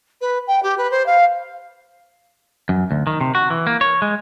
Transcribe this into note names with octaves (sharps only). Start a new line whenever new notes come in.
B4
G5
G4
B4
C5
F5
F#2
D2
D#3
C3
F#4
E3
A#3
C#5
G#3